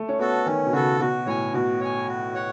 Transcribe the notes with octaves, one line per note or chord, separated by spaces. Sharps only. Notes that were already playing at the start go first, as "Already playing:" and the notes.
Already playing: A3
C#4
B3 F#4 A4
D#3 C#4
B2
C#3 F#4 A4
B2 F#4
A2 C#5 G#5
B2 F#4
C#5 G#5
F#4
C#5 F#5